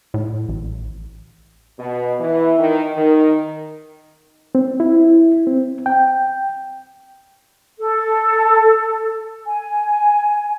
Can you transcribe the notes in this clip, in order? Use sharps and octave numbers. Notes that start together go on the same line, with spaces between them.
A2
A1
B2
E3
D#3
D#3
C4
E4
C4
G5
A4
G#5